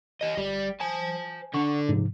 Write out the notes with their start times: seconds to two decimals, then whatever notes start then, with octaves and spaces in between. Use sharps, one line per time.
0.21 G4 D#5
0.37 G1 G3
0.80 C5 G#5 A5
1.54 D3 D4 F#5 C#6
1.89 G#2 C3 F3